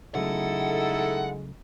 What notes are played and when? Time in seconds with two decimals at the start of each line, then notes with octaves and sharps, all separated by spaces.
0.15 C#3 F#3 G#3 A3 D#4 E4 A4 F#5